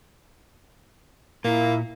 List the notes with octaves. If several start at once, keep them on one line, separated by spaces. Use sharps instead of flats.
A#2 A#3 E4